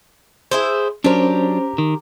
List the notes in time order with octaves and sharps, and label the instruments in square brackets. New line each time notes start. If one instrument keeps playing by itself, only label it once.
[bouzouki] E4 G#4 C5
[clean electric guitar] F#3 D4 [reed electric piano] C#4 C5 [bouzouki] G4 A#4
[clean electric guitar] D#3